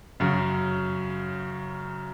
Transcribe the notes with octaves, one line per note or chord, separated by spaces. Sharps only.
F#2 C#3